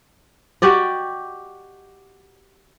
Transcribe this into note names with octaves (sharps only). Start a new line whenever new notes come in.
F#4 G4 D5 D#5